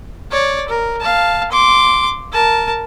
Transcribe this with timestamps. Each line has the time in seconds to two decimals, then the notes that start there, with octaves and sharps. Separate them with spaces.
0.31 C#5 D5
0.68 A#4
1.00 F5 A5
1.51 C6 D6
2.32 A#4 A5